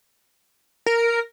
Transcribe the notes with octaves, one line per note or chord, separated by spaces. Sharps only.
A#4